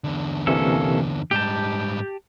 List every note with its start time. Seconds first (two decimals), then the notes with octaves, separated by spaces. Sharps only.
0.04 E2 D3
0.47 C3 E3 A#3 C#4 A4
1.31 G#2 G3 G4 A5 G6